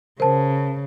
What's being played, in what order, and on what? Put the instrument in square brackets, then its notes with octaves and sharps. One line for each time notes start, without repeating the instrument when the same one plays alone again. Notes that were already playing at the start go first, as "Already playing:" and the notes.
[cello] C#3 [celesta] A#4 A5 [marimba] C5